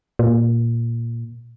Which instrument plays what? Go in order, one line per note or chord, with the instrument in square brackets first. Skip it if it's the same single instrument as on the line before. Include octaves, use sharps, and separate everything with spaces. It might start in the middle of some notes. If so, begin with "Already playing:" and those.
[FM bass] A#2